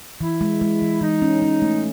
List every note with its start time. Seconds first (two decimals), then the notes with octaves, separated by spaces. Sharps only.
0.21 E3 E4
0.41 G#3
0.61 G#3
0.82 E3
1.02 E3 D#4
1.22 C#4
1.42 C#4
1.62 A3